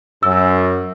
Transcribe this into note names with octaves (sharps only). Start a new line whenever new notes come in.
F#2 E6